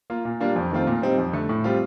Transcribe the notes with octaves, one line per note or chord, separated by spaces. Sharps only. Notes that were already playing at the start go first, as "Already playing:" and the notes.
A#3 F4
A#2
G3 A#3 D4 F4
F2
D#3 A3 C4 F4
A#2
G3 C4 D#4
F2
D3 A3
A2
G3 C4 F4